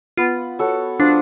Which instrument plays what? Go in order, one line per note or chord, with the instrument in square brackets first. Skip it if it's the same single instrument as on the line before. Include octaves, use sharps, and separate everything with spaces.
[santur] B3 [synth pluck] F4
[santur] F#4 A4 C#5
[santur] F3 [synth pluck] D4